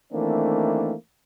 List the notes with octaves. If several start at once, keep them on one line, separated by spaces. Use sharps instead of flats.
D#3 E3 A3 A#3 C4 D4